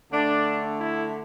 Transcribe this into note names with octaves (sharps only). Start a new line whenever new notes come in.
D3 A3 D4
E4